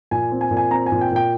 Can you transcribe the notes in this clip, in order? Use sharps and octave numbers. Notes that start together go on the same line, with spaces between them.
A#2 G#5
C4
G#5
A#2
G#5
C4 A#5
G#5
A#2
G5
A#2 G5